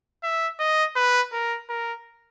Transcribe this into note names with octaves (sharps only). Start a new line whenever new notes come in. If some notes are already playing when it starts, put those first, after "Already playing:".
E5
D#5
B4
A#4
A#4